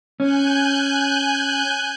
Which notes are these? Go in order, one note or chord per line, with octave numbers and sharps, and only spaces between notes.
C#4 G#5 F#6 G6